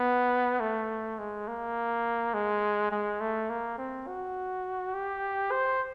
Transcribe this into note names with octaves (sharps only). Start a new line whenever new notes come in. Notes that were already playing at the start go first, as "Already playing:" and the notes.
Already playing: B3
A3
G#3
A#3
G#3
G#3
A3
A#3
C4
F#4
G4
C5